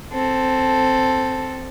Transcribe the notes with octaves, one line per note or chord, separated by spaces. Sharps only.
C4 A4